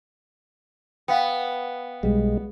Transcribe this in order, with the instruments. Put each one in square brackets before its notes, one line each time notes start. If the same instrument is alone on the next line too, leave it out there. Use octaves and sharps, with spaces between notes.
[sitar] B3 [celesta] F5 G5
[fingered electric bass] B1 G3 [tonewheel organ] G#3